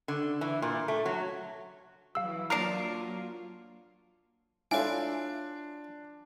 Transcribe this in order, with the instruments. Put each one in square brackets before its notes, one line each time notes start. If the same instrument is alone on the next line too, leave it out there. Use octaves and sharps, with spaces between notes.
[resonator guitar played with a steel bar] D3
E3
A#2
A3
F#3
[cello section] E3 F#3 [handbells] F5 E6
[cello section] F#3 A#3 F4 [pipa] D4 A#4 [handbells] F6 C7
[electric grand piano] D4 [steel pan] E4 A4 [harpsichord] F4 D5 F5 [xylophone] C#5 G#5